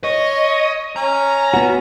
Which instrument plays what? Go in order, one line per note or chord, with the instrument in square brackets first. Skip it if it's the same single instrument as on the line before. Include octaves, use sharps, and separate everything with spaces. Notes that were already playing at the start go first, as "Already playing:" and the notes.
[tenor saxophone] C#5 [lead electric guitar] D#5
[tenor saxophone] C#4 [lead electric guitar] A#5
[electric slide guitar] B3 F#4